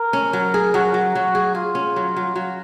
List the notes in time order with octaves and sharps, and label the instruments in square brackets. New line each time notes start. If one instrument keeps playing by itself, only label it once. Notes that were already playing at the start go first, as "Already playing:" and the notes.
Already playing: [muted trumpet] A#4
[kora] C#4
F#3
G#4
[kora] F#3 [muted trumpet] F#4
[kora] F#3
F#3
G#4
[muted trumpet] F4 [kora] G#4
[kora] C#4
F#3
F#3
F#3